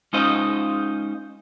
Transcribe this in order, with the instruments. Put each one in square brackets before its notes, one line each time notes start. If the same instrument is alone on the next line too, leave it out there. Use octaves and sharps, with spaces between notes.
[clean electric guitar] G#3 C#4 D#4 F4 C5 D#5